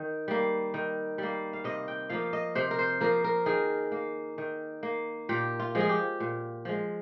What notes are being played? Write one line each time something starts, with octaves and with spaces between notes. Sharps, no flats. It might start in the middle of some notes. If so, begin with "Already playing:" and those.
Already playing: D#3
G3 A#3
D#3
G3 A#3
F5
C3 D#5
G5
F3 A#3 F5
D#5
C3 C5
A#4
C5
F3 A#3 A#4
A#4
D#3 G#4
A#3
D#3
A#3
A#2 G4
F4
F3 G#3
G#4
G4
A#2
F3 G#3